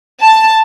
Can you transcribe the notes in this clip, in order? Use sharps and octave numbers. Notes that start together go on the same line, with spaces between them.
A5